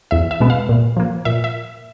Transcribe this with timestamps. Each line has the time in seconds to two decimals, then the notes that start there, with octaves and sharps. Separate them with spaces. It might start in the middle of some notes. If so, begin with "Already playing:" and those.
0.11 E2 E5
0.31 E5
0.40 B2 G#3 B3
0.50 F5
0.69 A#2
0.97 F3 A#3
1.25 A#2 E5
1.44 E5